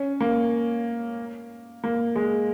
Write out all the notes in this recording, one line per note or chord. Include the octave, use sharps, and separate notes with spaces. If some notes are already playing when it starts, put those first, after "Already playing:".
Already playing: C#4
A#3
A#3
G#3